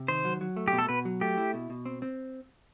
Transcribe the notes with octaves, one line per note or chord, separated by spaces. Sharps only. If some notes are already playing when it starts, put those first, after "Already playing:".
Already playing: C3
D#3 C5
F#3
F#3
A3
G4
B2
A4
B2 B4
F#3
A3 G4
E4
B2
B2
C4
C4